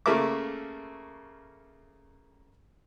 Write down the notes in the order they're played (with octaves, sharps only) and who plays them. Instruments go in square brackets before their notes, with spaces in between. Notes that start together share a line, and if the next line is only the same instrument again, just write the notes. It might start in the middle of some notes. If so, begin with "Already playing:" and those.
[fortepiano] C#3 A3 A#3 A#4 E5 D6